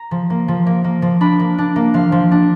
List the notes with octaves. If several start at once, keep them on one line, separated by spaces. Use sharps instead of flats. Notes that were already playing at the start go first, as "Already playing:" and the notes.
Already playing: A#5
F3
A#3
F3
A#3
A#3
F3
D4 B5
A#3
D4
A#3
F3 F5
F3
D4